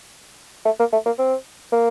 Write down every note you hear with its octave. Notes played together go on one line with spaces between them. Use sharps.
A3
A#3
A3
A#3
C4
A#3